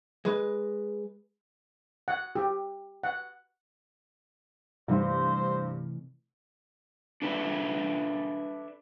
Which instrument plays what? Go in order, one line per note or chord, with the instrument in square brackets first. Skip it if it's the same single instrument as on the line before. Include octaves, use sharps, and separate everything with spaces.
[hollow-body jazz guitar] G#3 B4
[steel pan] F#5
G4
F#5
[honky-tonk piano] G2 [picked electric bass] C3 E3 A3 [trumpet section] C5
[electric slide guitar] D4 A4 B4 C#5 D5 E5